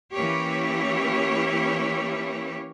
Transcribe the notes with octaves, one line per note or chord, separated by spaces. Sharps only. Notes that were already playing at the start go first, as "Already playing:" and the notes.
E3 A#3 C#4 E4 G4 C#5